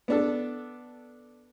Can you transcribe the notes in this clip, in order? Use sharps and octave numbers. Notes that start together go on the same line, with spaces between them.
B3 D4 A4